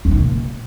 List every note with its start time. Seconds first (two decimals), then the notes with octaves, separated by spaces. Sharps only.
0.05 E2
0.11 D#3
0.17 A#2